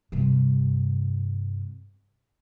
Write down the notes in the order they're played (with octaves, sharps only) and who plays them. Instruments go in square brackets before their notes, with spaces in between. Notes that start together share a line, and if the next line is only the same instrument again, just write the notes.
[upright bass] G2 C3